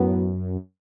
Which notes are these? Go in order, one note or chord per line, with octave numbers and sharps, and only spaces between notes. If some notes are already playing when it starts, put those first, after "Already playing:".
Already playing: F#2 A2 F#3 B3